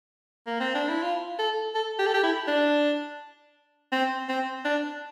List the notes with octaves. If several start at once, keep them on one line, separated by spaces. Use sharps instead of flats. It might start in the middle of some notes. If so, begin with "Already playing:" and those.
A#3
C4
D4
E4
F4
A4
A4
G4
A4
G4
E4
D4
C4
C4
D4